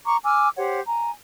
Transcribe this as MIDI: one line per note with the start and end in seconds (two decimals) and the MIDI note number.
0.05 0.17 82
0.05 0.17 85
0.05 0.17 86
0.24 0.49 80
0.24 0.49 86
0.24 0.49 88
0.24 0.49 89
0.57 0.80 67
0.57 0.80 72
0.57 0.80 73
0.57 0.80 78
0.87 1.11 80
0.87 1.11 82